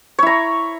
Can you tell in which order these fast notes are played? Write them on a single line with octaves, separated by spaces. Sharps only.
C#5 E4 A#5